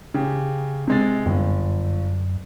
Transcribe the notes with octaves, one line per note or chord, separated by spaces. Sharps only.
C#3 G4
C3 G#3 A6
G1 F#2